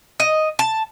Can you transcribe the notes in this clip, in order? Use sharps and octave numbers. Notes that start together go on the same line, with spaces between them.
D#5
A5